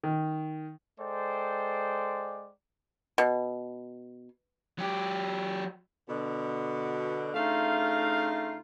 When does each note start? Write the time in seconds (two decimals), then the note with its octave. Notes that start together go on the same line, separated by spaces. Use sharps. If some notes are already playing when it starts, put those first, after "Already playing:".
0.03 D#3
0.99 G#3 A4 C5 D5 G5
3.18 B2
4.79 F#3 G4
6.08 B2 D3
7.34 C#3 A3 D4 D#4 F4 F5